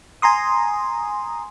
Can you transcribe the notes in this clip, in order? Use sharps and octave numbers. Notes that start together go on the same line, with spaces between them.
G#5 A#5 C6 D#6